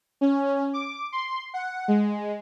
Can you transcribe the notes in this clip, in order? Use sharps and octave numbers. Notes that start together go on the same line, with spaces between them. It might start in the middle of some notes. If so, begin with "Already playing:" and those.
C#4
D6
C6
F#5
G#3